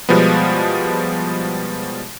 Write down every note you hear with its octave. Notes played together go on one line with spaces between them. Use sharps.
B2 F3 G3 G#3 B3